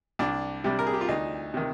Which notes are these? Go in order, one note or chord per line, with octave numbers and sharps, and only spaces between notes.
C2 D4
C3 G3 D4
A#4
G#4
G4
F4
D2 D#4
C3 D#3